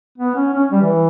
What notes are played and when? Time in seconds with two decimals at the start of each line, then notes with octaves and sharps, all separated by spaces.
0.18 B3
0.35 C#4
0.54 C#4
0.72 G3
0.81 E3